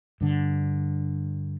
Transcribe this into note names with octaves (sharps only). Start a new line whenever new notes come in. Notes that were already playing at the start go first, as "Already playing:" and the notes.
G2 D3